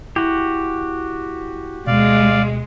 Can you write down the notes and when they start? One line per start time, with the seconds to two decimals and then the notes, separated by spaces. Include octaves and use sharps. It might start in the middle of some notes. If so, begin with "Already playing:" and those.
0.16 E4 F#4 G4
1.87 D2 B2 G#3 D5 F5